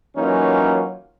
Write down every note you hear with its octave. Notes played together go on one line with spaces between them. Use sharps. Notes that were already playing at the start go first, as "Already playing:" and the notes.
E3 F#3 A#3 C#4 D#4 F4